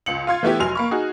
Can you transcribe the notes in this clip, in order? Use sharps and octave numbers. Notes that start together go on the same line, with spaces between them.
C#2 C#7 F#7
F4 F5 C6 G#6
E3 A3 B3 E4 G4
F1 F#3 G#5 C6 F6 F7
A#3 B5 C#6
D#4 F#4 G#4